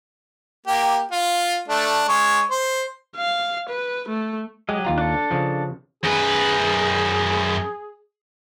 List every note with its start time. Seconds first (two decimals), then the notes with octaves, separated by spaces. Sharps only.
0.67 A#3 G4
1.12 F4
1.68 A3 D4
2.08 G#3 C#5
2.50 C5
3.17 F5
3.69 B4
4.09 A3
4.69 F#3 G#3 G4 D#5
4.85 D#2 F4 A#5
4.98 D4 A4
5.31 C#3 F3
6.03 F#2 G#4 B4